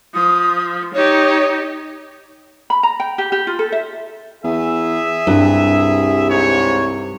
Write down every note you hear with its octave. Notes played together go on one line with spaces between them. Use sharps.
F3 D#6
D#4 G4 C#5
B5
A#5
G5
G4
G4
F4
A4
E5
E2 G#4 E5
C2 G2
G#2 C#5